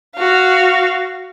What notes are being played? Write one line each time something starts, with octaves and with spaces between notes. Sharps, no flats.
F#4 F5